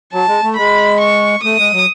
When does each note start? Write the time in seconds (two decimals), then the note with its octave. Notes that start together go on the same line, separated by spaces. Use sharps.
0.13 F#3 A5
0.28 G#3
0.43 A3
0.57 G#3 B5
1.01 C#6
1.44 A3 D#6
1.59 G#3
1.73 F#3